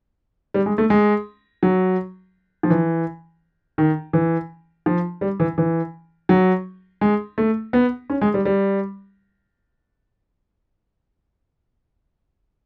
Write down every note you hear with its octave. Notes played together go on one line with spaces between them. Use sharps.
G3
G#3
A3
G#3
F#3
F3
E3
D#3
E3
F3
G3
E3
E3
F#3
G#3
A3
B3
C#4
G#3
G3
G3